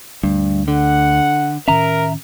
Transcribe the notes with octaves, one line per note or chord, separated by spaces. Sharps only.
D2 G2
D3 F#5
A2 D#3 C#4 A#4 E5 A#5